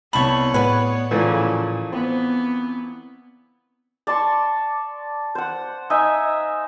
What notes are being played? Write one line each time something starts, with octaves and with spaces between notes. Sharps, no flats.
C2 B3 C#5 A5 B5 C#6
A2 G#4 B4 D5 F#5
A#2 C#3 E3 F3 A3
B3 C4
D5 A5 C6 C#6
C5 F#5
D#4 E5 G#5